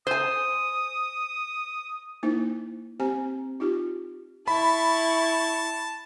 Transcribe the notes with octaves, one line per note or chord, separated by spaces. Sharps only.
C5 G#5 D#6
A#3 D#4 E4 C5
C4 G4 C5 G#5
D#4 F4 G4
E4 A5 B5 C#6